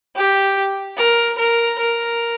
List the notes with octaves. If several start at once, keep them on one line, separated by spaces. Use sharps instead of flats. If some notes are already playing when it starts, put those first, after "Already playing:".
G4
A#4
A#4
A#4